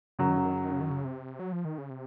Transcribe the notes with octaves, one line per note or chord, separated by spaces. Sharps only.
F#2 C#3 F#3
D#3
C#3
D#3
C#3
D#3
C#3
D#3
C#3
C3
F#3
F3
D#3
C#3
C3